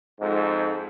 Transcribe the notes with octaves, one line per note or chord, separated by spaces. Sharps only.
F2 G#2